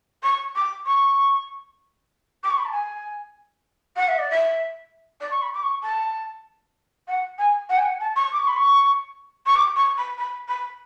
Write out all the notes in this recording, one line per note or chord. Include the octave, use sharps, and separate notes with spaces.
C#6
D6
C#6
D6
C#6
B5
A5
G#5
F#5
E5
D5
E5
D5
C#6
B5
D6
C#6
A5
F#5
G#5
F#5
G#5
F#5
A5
C#6
D6
C#6
B5
C#6
C#6
D6
C#6
B5
B5
B5